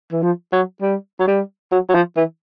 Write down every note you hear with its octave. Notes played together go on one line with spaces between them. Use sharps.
E3
F3
F#3
G3
F#3
G3
F#3
F#3
F3
E3